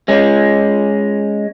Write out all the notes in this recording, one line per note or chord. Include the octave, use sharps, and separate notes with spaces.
G#3 C#4